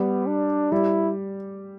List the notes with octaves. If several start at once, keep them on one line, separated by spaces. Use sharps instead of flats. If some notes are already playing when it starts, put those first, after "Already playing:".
Already playing: G3 B3
D4
G3 E4